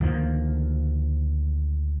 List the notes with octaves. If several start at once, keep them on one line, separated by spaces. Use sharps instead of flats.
D2 D#3 F3 A#3